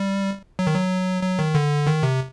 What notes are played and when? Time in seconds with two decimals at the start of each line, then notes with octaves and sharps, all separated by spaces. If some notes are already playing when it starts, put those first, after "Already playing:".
Already playing: G3
0.59 F#3
0.67 D#3
0.74 F#3
1.23 F#3
1.39 D#3
1.55 D3
1.87 D#3
2.03 C3